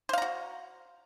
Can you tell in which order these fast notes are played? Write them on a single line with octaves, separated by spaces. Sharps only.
C5 F5 A#5 F#4